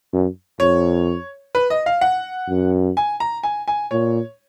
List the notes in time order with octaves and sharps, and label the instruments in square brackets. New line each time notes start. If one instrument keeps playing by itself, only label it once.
[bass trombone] F#2
[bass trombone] F2 [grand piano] C#5
[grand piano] B4
D#5
F5
F#5
[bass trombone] F#2
[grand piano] G#5
A#5
G#5
G#5
[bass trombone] A#2 [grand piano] C#5